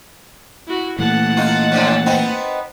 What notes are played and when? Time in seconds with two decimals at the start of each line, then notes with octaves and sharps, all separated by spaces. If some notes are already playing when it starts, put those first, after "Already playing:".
0.67 E4 F#4
0.99 A#2 E3 A3 F#5 A5
1.37 D#4 F4
1.72 A2 D3 F3
2.06 B3 C4 D#4